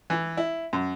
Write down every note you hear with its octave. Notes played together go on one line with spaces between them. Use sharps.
E3
E4
F#2